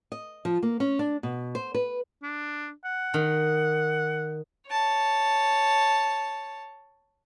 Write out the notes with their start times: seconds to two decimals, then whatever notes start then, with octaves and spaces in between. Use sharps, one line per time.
0.12 D#5
0.45 F3
0.63 A#3
0.80 C#4
0.99 D4
1.23 B2
1.55 C5
1.74 B4
2.23 D4
2.85 F#5
3.14 D#3
4.69 C#5 A5